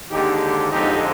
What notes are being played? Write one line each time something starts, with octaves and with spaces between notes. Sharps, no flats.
D#2 D3 G#3 D#4 G4
F2 D3 G#3 C4 D#4 G4